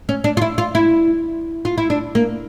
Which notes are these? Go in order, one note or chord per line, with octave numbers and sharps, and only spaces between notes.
C#4
D4
F4
E4
F4
E4
F4
E4
D4
A#3